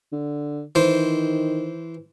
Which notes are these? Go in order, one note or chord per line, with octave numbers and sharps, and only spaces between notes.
D3
D#3 E3 C5